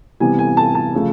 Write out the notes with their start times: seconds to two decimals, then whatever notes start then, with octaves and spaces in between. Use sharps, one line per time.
0.20 C3 E3 G3 B3 G#5
0.39 G#5
0.57 A5
0.75 A5
0.94 C#3 F3 A3